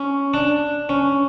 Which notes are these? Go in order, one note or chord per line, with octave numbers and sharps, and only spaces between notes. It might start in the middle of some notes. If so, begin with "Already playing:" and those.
Already playing: C#4
D4
C#4